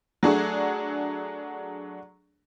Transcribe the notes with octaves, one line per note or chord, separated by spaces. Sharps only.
F#3 A3 D4 F#4 G#4